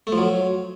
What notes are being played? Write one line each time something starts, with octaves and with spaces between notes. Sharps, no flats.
A3
F3
F#3